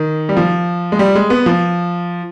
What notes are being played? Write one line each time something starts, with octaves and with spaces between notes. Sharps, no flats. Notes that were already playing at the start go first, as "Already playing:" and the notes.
Already playing: D#3
G3
F3
G#3
G3
G#3
B3
F3